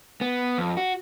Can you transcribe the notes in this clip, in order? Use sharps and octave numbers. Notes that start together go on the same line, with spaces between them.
B3
F2
F#4